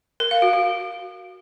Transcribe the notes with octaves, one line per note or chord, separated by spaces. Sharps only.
A#4
F5
F#4
F#4